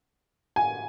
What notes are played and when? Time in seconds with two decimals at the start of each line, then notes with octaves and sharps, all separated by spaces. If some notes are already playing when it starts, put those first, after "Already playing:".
0.56 G#5